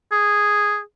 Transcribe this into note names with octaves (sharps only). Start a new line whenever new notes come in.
G#4